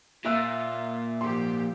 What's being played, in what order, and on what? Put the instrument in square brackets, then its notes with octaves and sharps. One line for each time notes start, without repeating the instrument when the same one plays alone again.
[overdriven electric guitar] A#2 [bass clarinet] F4 [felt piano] E5 E6 F#6
[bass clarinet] G#2 [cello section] F3 G4 [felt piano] C6